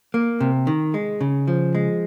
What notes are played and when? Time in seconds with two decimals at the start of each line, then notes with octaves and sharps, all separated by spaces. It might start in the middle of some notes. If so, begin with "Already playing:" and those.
0.14 A#3
0.40 C3
0.67 D#3
0.94 G#3
1.21 C#3
1.48 F3
1.75 G#3